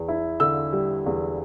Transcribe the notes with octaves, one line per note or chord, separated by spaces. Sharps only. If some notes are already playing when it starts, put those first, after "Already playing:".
Already playing: E2
E4
D3 E6
G3
E2